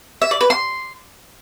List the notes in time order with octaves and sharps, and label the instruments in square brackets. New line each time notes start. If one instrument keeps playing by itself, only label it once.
[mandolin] E5
D5
B4
C6